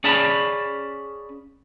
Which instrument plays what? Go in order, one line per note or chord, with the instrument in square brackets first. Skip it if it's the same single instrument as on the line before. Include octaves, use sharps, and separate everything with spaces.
[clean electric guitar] C#4 G#4 D5 F5 A5 B5